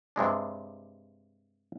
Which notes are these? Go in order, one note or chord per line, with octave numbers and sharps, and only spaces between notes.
G2 C3 G#3 D4